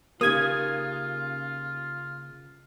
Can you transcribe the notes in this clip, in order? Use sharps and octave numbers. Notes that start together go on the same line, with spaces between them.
C#3 A#3 D#4 F4 G4 A#4 D#6 G#6